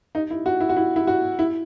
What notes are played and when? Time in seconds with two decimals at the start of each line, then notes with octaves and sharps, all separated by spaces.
0.15 D#4
0.30 E4
0.46 F#4
0.60 E4
0.69 F#4
0.76 E4
0.96 E4
1.07 F#4
1.39 E4